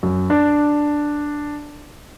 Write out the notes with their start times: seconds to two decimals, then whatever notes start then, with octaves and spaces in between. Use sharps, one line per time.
0.03 F#2
0.30 D4